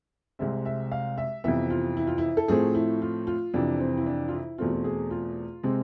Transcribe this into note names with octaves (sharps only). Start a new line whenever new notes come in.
C2 C3 G#3 C4 E5
E5
F5
E5
F2 C3 E3 B3 E5
F4
E4
F4
E4
A4
A2 F3 A3 C4 G#4
E4
F4
F4
F2 C3 E3 D4
C4
E4
D4
F4
E4
E2 B2 A3 C4 F4
F4
G#4
F4
C3 G#3 C4